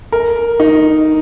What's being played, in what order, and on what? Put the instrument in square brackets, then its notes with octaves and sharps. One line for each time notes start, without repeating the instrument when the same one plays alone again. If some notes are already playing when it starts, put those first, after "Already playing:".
[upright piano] A#4
D#4